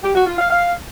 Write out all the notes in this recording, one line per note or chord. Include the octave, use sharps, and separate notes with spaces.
G4
F#4
F4
F5
F5